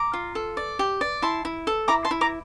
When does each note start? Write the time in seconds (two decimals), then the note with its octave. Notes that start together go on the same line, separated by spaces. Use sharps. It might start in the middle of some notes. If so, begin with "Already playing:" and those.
Already playing: A#5 D6
0.13 F4
0.35 A4
0.57 D5
0.79 G4
1.01 D5
1.22 E4 A5 C6
1.45 E4
1.67 A4
1.88 E4 A#5 D6
2.05 A5 C6
2.11 E4
2.21 A#5 D6